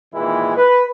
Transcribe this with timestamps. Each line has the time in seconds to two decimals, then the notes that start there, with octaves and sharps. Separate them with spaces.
0.14 A#2 D#3 E3 G#3 E4
0.57 B4